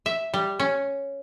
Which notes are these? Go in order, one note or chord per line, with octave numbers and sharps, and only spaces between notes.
E5
G3
C#4